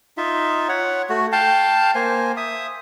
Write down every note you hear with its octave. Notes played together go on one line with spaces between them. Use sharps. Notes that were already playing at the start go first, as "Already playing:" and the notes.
D#4 F4 E5
C#5 F#5
A3 F#4
F5 G5 A5
A#3 C5 G#5
E5 D#6